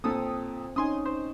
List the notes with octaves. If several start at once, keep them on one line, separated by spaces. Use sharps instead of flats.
A#2 C4 A4 D#6
C#4 D#4 G#5 C6 D#6
C5